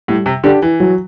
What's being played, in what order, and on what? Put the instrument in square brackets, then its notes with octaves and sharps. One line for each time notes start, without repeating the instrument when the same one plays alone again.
[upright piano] A2 [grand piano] G3
[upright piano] C3
[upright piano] D3 [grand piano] D4 G4
[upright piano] E3
[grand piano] F#3